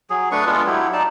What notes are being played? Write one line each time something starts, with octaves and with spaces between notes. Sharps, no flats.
F#3 G#4
A3 D4 B4 C#6
G#3 B3 F4 A4
F#3 E4 G4
D#4 D5 A5